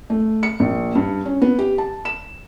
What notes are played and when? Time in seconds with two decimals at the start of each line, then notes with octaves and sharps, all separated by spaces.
0.10 A3
0.43 C#7
0.60 A#1
0.95 G2
1.25 C#4
1.42 B3
1.59 G4
1.78 A5
2.05 E7